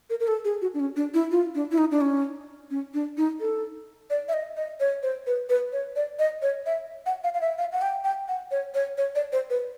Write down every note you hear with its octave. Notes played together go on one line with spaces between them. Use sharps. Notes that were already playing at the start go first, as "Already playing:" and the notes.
A#4
A#4
A4
G#4
F#4
D4
C#4
D4
E4
F4
D4
E4
D#4
D4
C#4
C#4
D4
D#4
A4
D5
E5
D#5
D#5
C#5
C5
B4
B4
C#5
D5
D#5
C#5
E5
F#5
F5
F5
E5
F5
F#5
G5
G5
F#5
C#5
C#5
C#5
D5
C5
B4